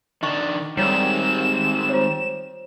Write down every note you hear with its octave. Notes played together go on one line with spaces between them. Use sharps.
D#3 D4 D#5 C#6
D#3 G3 G#3 C4 F4 C#5 E7
F4 C5 C#5